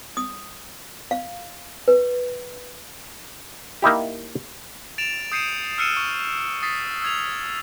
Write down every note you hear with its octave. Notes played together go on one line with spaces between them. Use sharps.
D#6
F5
B4
A#3 D#4 E4 G4
A6 D7 E7 F7
D#6 G6 C7 C#7 D#7 E7
E6 F6 C7 C#7 D#7 E7
C#6 D#7
D#6 A6 B6 C7
E6 G#6 F7